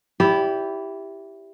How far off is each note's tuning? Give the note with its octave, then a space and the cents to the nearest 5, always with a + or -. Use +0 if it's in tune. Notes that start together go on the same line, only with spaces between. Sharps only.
E4 +0 G4 +0 D5 -30